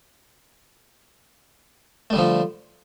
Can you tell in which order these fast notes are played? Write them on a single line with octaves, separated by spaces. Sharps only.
A3 G3 D3 F3